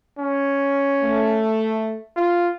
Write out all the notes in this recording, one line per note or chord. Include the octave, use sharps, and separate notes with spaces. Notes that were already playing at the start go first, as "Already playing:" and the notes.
C#4
A3
F4